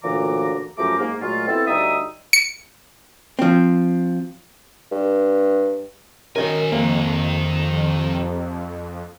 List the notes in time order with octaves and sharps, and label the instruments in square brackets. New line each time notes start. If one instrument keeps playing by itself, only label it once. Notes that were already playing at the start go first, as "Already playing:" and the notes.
[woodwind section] D2 A#2 C#3 E3 A#5 D6
F#2 F3 A3 G4 A#5 D6
G#2 A#3
A#2 F#3 G#3 A3 F4
B3 C4 E4 A4
D2 G3 D#4 E5 D#6
[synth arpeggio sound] C#7
[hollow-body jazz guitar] F3 C4
[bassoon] G2
[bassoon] F#2 [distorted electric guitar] D#3 G#5 [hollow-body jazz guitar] A#4 D#5
[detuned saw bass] F2 [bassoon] C3 [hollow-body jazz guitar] A#3